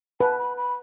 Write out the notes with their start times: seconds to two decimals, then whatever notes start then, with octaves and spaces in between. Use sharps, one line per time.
0.20 B4 A5
0.39 B5
0.57 B5